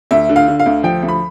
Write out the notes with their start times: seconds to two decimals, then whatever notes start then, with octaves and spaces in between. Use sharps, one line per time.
0.11 D2 E5
0.29 D3
0.36 F5
0.48 D3
0.60 F5
0.66 D2
0.83 F3 G5
1.03 D2
1.09 B5